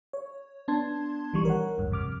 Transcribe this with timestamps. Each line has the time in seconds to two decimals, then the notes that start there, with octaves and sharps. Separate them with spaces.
0.13 C#5
0.68 B3 D4 A5 C6 G#6
1.33 A#1 D#3 E3 G3 C#6
1.45 A#4 C#5 F#5
1.78 G#1 D2 G2
1.91 F2 C3 D6 F6